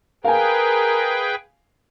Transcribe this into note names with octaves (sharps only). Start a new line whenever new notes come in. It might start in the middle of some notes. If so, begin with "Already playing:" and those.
G#4 A#4 B4 F5 G5 G#5